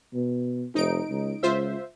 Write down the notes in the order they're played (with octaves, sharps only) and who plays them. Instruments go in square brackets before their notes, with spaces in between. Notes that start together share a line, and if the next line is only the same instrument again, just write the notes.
[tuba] B2
[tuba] F1 [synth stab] D#4 D7
[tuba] C#2
[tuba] C#2 [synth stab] F4 C5 E5